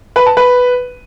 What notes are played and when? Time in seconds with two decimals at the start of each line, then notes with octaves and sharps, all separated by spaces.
0.16 B4
0.26 A5
0.37 B4